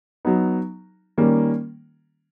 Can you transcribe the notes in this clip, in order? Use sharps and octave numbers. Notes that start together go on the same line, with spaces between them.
F#3 B3 D#4
D#3 G3 A#3 C#4